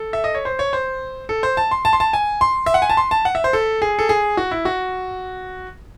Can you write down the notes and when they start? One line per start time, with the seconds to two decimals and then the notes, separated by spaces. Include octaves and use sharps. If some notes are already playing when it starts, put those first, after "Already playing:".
Already playing: A4
0.13 E5
0.24 D#5
0.35 C#5
0.45 C5
0.59 C#5
0.73 C5
1.29 A4
1.43 C5
1.57 A5
1.71 C6
1.85 A5
1.93 C6
2.00 A5
2.13 G#5
2.41 C6
2.66 E5
2.74 F#5
2.82 G#5
2.90 A5
2.97 C6
3.11 A5
3.25 F#5
3.35 E5
3.44 C5
3.53 A4
3.82 G#4
3.99 A4
4.09 G#4
4.37 F#4
4.51 E4
4.65 F#4